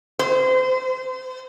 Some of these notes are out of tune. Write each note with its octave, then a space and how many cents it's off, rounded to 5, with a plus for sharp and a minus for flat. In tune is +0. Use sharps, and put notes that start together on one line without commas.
C5 -30